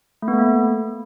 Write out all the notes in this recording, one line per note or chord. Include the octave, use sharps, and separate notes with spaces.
A3
B3
A3
A#3